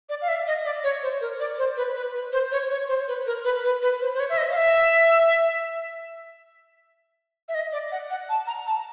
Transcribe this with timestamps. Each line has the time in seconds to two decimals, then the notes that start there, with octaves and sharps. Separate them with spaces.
0.09 D5
0.22 F5
0.28 E5
0.47 D#5
0.65 D5
0.84 C#5
1.03 C5
1.21 A#4
1.40 D5
1.58 C5
1.77 B4
1.96 B4
2.15 B4
2.32 C5
2.52 C#5
2.71 C#5
2.88 C5
3.08 B4
3.27 A#4
3.44 B4
3.64 B4
3.82 B4
4.01 C5
4.14 C5
4.20 C#5
4.29 E5
4.38 D#5
4.51 F5
4.56 E5
7.49 E5
7.55 D#5
7.72 D5
7.92 F#5
8.10 F#5
8.29 A5
8.47 A#5
8.67 A5